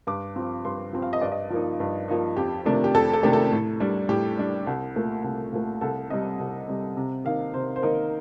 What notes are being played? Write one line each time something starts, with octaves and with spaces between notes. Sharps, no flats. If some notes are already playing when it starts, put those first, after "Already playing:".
G2 D6
F3 C4
G2 C6
F3 C4
F5
D#5
G2 D5
D#5
F3 A#3 D#4
G2
F3 A#3 D#4
F2 G4
C3 D#3 A3 D4
G4
F2 A4
A4
C3 D#3 A3 D4 G4
A4
A2
G3 D4
A2 G4
G3 D4
C2
A#2 A3
C2
A#2 A3
C2 A4
C3 G3 D#5
C2
C3 G3
C3
D#3 A#3 D#4 F5
C3 C5
C5
D#3 A#3 D#4 A#4